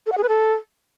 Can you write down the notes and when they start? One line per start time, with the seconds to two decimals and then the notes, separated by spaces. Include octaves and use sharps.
0.06 A4
0.12 F#5
0.18 G#4
0.23 B4
0.29 A4